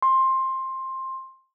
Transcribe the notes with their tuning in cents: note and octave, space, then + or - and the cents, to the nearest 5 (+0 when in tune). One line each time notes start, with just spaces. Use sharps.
C6 +15